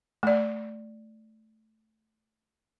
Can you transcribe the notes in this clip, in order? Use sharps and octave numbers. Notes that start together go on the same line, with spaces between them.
A3 D5